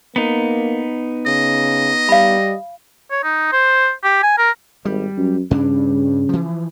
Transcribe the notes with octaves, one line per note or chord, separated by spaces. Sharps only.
A#3 B3 D#4
C#3 D#5
G3 F5 B5
C#5
D#4
C5
G4
G#5
A#4
G#1 G3
F#2
G2 C#3 C#4 D4
E3 F3